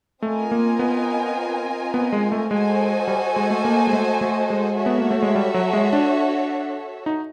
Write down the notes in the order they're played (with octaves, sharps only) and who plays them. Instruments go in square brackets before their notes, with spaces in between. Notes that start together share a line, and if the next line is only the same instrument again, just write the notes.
[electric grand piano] A3 [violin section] C4 F4 A#4 D#5 G#5
[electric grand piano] A#3
B3
B3
G#3
A3
[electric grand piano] G#3 [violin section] F#4 A4 C5 D#5 G#5
[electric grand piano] G3
G#3
A3
A#3
G#3
A3
A3
G#3
[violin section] F#4 A4 C#5 E5
[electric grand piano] B3
A#3
A3
G#3
G3
F#3
G#3
D4
D#4